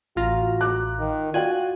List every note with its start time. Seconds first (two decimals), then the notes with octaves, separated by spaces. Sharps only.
0.16 A1 F4 F#4 A#5
0.61 D6 F#6
0.99 D#3
1.34 F4 F#4 D5 G5 G#5 F#6